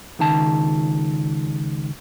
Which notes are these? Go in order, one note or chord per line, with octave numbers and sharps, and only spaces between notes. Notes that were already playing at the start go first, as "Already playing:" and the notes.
C#2 D#3 A5